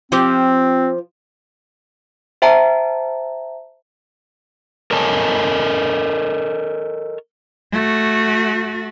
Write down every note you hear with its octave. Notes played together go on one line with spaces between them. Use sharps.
F3 C4 F4 G4
C5 E5 G5 A5 A#5
A4 A#4 C#5 D#5 G#5 A5
A3 F#4